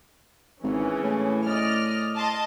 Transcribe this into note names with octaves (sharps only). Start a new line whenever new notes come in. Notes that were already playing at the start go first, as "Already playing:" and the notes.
G#1 C#3 E3 C#4
A2
D5 D#5 F6
D#5 A5 C6